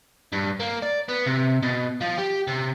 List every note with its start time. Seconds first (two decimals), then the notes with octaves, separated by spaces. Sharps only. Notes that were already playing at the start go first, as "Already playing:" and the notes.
0.33 G2
0.60 A#3
0.82 D5
1.09 B3
1.26 C3
1.63 B2
2.02 F3
2.19 G4
2.49 C3